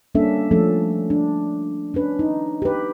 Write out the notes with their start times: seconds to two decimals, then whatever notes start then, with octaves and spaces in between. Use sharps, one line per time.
0.15 G3 A#3 C#4 D4 A4 E5
0.51 F3 A3 C#4 A4
1.10 D4
1.94 C#4 D4 B4
2.19 D#4
2.62 G4 B4